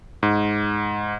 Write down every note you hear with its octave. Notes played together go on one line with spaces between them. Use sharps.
G#2